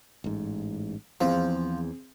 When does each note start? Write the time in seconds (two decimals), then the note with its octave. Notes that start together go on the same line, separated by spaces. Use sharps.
0.24 A1 G#2
1.21 E2 F3 C4 G#4